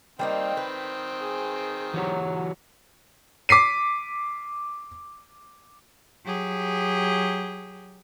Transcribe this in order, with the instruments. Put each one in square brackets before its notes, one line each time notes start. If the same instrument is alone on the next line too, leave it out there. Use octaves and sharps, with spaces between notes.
[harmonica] D#3 C4 [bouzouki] G3 A#3 D#4
[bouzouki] B4
[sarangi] G#4
[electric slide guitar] E3 F#4 G4 [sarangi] F#3
[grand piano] D6 B6 C7 D#7
[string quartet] F#3 G4 G#4